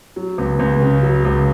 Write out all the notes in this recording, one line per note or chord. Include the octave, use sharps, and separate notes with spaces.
F#3
C#2
C#2
C#3
F#3
C#2